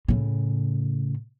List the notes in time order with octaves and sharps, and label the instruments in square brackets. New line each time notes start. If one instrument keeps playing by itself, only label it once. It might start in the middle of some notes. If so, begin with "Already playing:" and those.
[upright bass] A2 C#3